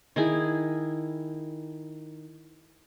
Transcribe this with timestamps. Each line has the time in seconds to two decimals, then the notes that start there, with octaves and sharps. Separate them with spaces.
0.16 D#3 E4 G#4